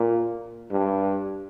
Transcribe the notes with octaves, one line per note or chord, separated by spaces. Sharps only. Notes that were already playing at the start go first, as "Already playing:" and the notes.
Already playing: A#2
G2